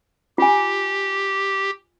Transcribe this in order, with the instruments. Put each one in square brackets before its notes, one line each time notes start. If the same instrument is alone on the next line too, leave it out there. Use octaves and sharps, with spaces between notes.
[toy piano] F4 G#5 [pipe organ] G4